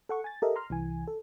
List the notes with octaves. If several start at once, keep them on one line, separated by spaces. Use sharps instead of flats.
A4 F#5 C#6
G#5 A6
G4 A4 A#4 D#5 E5
A#5 C6 F6
C2 E3 G#5
A4